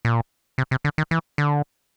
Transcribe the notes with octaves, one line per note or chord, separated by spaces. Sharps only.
A#2
C3
C3
D3
D#3
E3
D3